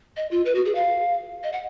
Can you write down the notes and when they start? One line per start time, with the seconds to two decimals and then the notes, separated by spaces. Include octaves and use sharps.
0.17 D#5
0.31 F4
0.46 B4
0.55 F#4
0.66 G#4
0.75 F5
1.44 D#5
1.53 F#5